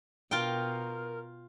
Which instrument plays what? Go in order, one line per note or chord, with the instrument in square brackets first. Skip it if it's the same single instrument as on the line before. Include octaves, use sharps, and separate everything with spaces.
[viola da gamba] B2 [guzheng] F4 G5 [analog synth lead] A#4